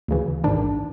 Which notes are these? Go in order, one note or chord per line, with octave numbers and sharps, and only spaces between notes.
D2 C#3 E3
A1 G#2 D#3 D4